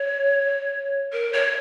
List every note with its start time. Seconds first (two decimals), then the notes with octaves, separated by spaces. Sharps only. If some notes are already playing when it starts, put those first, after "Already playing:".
Already playing: C#5
1.13 A#4
1.33 C#5